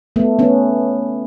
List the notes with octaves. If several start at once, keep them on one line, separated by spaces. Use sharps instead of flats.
A3 B3
B3 C#4